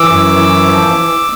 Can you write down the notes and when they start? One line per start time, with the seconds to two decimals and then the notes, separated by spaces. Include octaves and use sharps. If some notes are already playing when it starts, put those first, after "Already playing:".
Already playing: E3 D6 E6
0.09 F#2
0.36 E3
0.65 F3